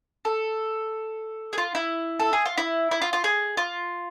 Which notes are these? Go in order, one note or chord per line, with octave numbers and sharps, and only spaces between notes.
A4
G#4
F4
E4
A4
G#4
F4
E4
E4
F4
F4
G#4
F4